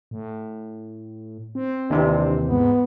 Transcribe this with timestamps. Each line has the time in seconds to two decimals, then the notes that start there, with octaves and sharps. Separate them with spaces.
0.11 A2
1.55 C4
1.90 D#2 C3 E3 D4
2.49 G#2 B3